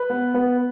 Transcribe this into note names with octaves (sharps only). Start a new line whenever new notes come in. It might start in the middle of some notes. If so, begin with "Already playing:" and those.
Already playing: B4
B3
B3